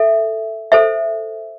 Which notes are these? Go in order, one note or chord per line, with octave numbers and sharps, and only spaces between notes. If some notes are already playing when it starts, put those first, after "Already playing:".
Already playing: A4 E5
A4 C5 E5